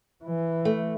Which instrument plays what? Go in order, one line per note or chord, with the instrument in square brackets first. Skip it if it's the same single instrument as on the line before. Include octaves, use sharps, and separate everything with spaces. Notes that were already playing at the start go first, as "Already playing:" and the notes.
[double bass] E3
[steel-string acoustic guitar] A3